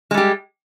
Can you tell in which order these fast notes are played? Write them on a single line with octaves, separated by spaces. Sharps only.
G#3 G3 G4